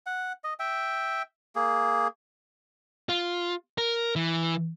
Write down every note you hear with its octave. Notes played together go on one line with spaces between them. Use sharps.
F#5
D#5
E5 G5
A#3 G#4
F4
A#4
E3